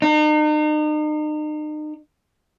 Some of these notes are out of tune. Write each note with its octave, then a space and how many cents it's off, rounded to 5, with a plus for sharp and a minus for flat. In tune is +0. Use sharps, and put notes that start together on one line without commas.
D#4 -40